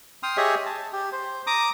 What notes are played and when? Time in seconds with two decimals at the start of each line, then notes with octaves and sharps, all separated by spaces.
0.23 G5 C6 D#6 F6
0.37 G4 G#4 C#5 D#5 E5
0.66 A5
0.93 G4
1.12 C5
1.47 A#5 D6 D#6